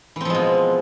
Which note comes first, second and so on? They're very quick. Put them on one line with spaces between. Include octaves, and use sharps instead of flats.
E3 C4 F3 G#3 B2